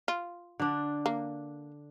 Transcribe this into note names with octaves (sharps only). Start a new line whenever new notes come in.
F4
D3 D4
A#3